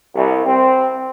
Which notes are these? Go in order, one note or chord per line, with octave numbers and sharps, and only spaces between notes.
C2
C4